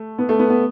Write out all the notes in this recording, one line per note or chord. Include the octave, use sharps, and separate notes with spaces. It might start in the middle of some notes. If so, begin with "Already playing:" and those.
Already playing: A3
B3
A3
B3
B3